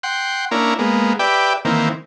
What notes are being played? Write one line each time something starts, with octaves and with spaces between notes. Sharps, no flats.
F#5 G5 C6
A#3 C#4 D4 E4 A#4
G#3 A#3 B3
G4 B4 D5 E5 G5
D#3 E3 A#3 C4